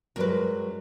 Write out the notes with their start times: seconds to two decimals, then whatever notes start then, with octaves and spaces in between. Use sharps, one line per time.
0.16 G2 F#3 G#3 A#4 B4